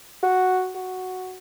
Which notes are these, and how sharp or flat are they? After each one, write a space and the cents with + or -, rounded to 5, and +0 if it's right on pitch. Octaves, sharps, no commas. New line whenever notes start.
F#4 +0
F#4 +0